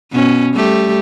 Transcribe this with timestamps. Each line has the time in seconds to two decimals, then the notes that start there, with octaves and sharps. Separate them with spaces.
0.12 B2 C#4
0.55 G3 A3 G4